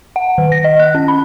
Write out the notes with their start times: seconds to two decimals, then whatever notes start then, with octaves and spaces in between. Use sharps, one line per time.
0.16 F#5
0.38 D#3
0.52 A#6
0.64 D#5
0.80 F#6
0.95 C#4
1.08 B5